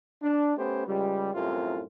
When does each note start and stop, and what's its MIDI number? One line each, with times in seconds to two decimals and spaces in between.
0.23 0.55 62
0.57 0.85 57
0.57 0.85 59
0.57 0.85 61
0.57 0.85 67
0.57 0.85 72
0.87 1.33 37
0.87 1.33 55
1.33 1.83 36
1.33 1.83 42
1.33 1.83 45
1.33 1.83 48
1.33 1.83 65